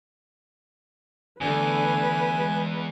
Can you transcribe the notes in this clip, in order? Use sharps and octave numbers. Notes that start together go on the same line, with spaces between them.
E2 D3 A3 B4 G#5
G#3